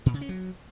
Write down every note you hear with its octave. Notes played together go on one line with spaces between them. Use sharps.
A#2
C#3
C#4
F#3